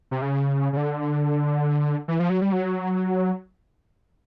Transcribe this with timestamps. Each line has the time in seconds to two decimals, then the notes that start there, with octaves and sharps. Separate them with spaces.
0.11 C3
0.22 C#3
0.73 C#3
0.77 D3
2.08 E3
2.20 F3
2.30 F#3
2.41 G3
2.52 F#3